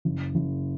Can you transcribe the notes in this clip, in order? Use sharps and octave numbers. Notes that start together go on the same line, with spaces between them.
F#1
F#1